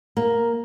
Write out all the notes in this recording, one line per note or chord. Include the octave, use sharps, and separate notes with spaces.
A#3